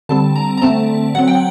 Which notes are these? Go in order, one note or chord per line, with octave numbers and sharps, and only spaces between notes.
D3 G3 C4 A5
A#5
A#5
D3 A3 C4 A5
F#3 C4 F#5
G5